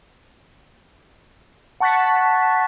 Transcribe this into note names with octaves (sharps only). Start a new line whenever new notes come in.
F#5 A5 C#6 F#6 A6 B6